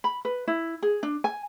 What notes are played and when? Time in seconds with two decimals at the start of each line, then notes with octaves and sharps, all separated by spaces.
0.04 B5
0.25 B4
0.48 E4
0.83 G#4
1.03 D4
1.24 G#5